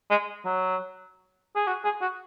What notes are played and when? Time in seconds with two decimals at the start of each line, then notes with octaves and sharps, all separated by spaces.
0.10 G#3
0.45 F#3
1.56 G#4
1.67 F#4
1.84 G#4
2.01 F#4